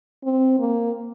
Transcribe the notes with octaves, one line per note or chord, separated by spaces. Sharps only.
C4
A#3